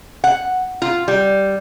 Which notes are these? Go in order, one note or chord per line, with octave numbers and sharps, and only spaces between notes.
F#5
F4
G3